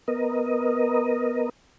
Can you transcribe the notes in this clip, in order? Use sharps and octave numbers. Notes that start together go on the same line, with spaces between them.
B3 A#4 D#5